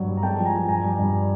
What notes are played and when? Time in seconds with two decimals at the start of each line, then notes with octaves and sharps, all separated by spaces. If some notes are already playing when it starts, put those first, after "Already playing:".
Already playing: G2 F#3
0.08 G3
0.17 A#5
0.23 G#3 G5 A5
0.38 F3
0.45 G#5 A#5
0.54 F3
0.68 G2 G#5 A#5
0.84 G3
0.99 G2